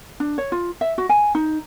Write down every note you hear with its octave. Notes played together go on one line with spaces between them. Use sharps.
D4
C#5
F4
E5
F#4
G#5
D#4